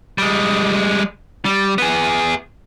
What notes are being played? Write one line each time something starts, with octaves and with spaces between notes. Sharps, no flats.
G3 G#3
G3
B3 G#4